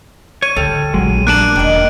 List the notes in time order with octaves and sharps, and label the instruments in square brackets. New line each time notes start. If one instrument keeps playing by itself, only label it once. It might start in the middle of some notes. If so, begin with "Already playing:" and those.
[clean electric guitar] C#5 [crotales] D#7
[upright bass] D2 [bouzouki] G3 [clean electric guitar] A4
[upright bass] A#1 [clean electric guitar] F#3 G#3
[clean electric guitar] A#3 D4 A5 [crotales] F#6 D7 F#7
[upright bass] E1 [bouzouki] D#3 D#5